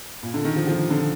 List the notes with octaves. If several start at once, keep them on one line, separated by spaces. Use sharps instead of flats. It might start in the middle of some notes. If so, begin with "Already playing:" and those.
A#2
D3
D#3
F3
F3
D3